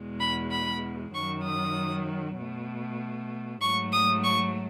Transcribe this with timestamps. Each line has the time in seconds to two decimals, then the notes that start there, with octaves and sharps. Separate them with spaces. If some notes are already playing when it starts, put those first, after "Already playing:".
Already playing: E2 B2 G#3
0.20 B5
0.51 B5
1.13 F#2 D#3 F#3 C#6
1.44 D#6
2.37 B2
2.42 A3
3.61 G#2 F#3 A3 C#6
3.92 D#6
4.23 C#6